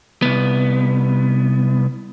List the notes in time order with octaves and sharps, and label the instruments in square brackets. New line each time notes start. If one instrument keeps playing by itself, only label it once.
[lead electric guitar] C2 B3